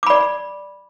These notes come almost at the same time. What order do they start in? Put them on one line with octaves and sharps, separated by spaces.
D6 B5 D5